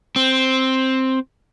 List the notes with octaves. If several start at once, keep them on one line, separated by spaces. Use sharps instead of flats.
C4